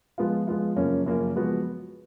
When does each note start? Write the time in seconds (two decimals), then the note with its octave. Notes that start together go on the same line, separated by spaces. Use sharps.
0.18 F3 G#3 B3 F4
0.47 F3 G#3 B3 F4
0.76 F#2 C#3 F3 A#3 C#4
1.06 F#2 C#3 F3 A#3 C#4
1.35 F3 G#3 B3 F#4